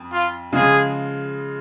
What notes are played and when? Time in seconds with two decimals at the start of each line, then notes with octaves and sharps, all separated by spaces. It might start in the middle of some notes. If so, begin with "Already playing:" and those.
Already playing: F2
0.13 F4
0.52 C#3 F3 G#3 F4 G#4